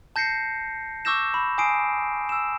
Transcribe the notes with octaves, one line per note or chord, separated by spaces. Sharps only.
A5 G6 A#6 C7 C#7
C#6 D6 E6 G6 A#6 E7
B5
G#5 D#6 C7 D7
E6 E7